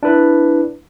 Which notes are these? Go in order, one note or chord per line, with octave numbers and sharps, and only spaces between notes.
D4 E4 B4